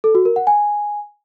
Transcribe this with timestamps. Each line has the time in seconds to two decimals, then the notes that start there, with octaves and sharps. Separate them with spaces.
0.04 A4
0.15 F#4
0.25 A#4
0.36 F#5
0.47 G#5